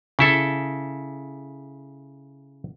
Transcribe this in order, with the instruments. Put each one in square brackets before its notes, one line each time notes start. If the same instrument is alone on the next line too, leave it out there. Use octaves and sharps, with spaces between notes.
[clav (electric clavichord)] C#3 E4 A4